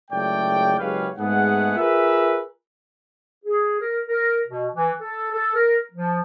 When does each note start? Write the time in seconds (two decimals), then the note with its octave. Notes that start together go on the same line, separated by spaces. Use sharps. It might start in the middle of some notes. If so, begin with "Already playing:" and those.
0.11 F#1 C#2 A3 D5 G5
0.79 F#1 G#3 G4 B4 C#5 F5
1.18 G#2 G#3 A3 B3 G#4 F#5
1.76 F4 G#4 A#4 B4 E5
3.45 G#4
3.80 A#4
4.07 A#4
4.47 B2
4.74 E3
5.00 A4
5.32 A4
5.54 A#4
5.92 F3